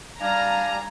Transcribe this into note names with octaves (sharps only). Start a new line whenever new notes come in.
G3 D4 F5 G#5 A#5